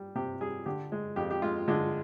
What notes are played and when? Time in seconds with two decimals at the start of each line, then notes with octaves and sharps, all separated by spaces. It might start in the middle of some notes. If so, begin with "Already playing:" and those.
Already playing: G3
0.15 C3 G4
0.41 G3 G#4
0.66 D3 G4
0.92 G#3
1.16 F2 G4
1.31 G4
1.42 G#3 F4
1.68 D3 G#3